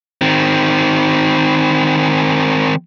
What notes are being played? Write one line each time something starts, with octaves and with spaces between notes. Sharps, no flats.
D#3 C4